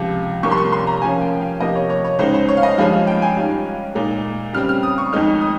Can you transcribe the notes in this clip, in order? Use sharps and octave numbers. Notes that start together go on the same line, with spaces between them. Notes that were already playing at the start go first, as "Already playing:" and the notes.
Already playing: C#2 C3 F3
C2 C3 F3 A#3 C#6
C6
C#6
C6
A#5
C#3 F3 A#3 C#4 G#5
G5
F5
C3 F3 A#3 D#5
C#5
C#5
C#5
C#2 C#3 G#3 D#4 C5
C5
C#5
F5
D#5
G2 F3 G#3 C#4 F4 F5
F5
G5
G#5
G#2 G3 C#4 F4
A#2 G#3 D#4
C#3 G3 C4 F6
F6
D#6
C#6
F2 D#3 G#3 D#4 F6
D#6